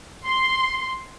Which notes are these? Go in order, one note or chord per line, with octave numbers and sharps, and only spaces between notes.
C6